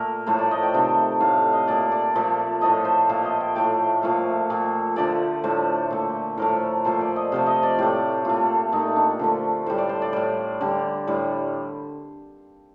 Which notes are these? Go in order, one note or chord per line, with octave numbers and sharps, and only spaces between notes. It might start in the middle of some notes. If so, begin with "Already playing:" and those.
Already playing: A#2 A3 A#4
A2 F3 A3 C5
D5
D#5
G5
C3 D#3 A3
A2 A3 F5
F5
D#5
A#2 A3 D5
D5
A#2 F3 A3
A2 F3 A3 D#5
C5
A#2 A3 F5
D#5
G5
A2 A3 G5
A#2 F3 A3 F5
A#2 A3
D3 F3 A3 D5
A2 A3 C5
A#2 A3
A2 F3 A3 A#4
A#2 F3 A3 C5
D5
D#5
C3 F3 A3 F5
D#5
D5
A2 A3 G4
A#2 A3 F4
A#2 A3 D#4
D4
D3 F3 A3
A2 G3 C5
D5
C5
D5
A2 G3 D5
D3 G3
A2 G3